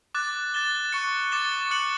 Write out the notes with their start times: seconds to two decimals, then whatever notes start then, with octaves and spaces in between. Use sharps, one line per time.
0.15 D6 F#6 A6
0.54 F#6 A6 E7 G7
0.92 C#6 F#6 C#7
1.32 D6 A6 C#7 E7 G7
1.71 F#6 C#7 F#7